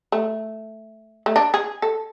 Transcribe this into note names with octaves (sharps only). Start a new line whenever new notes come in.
A3
A3
D4
G#4
A4